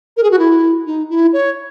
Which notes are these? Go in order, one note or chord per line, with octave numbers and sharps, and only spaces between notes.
A#4
G#4
F#4
E4
D#4
E4
C#5